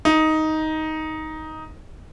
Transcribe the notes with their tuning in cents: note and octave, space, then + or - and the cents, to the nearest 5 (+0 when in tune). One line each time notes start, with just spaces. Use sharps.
D#4 +10